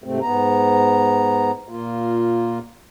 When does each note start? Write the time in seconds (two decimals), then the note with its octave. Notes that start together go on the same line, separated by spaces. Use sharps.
0.04 G#2 C3 A3 C4
0.21 G#2 B3 A#5
1.68 A#2 A#3 F4